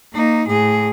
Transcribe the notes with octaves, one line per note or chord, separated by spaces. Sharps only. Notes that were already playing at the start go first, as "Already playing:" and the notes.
A#3 D#4
A2 G#4